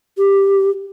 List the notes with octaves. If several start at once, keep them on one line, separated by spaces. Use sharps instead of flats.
G4